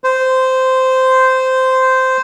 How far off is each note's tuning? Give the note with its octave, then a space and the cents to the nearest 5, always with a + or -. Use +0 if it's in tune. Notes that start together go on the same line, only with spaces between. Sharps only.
C5 -10